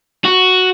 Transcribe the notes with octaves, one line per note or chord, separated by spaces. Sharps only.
F#4